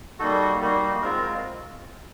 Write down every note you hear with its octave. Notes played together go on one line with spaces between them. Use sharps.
G3 A#3 D#4 F#4 A4
G3 A#3 D#4 F#4
G#3 C4 F4 A#4
A#4